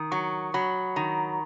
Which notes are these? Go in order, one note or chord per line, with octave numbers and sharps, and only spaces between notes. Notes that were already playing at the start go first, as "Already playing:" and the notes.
Already playing: D#3 D#6
F#3 C#6
F#3 B5
D#3 A#5